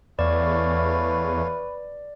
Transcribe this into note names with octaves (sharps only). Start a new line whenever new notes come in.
E2 A3 B4 C#5 D5 F5